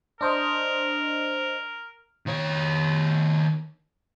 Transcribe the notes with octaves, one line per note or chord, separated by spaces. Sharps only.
D4 A#4 C5 D#5
D#3 C#5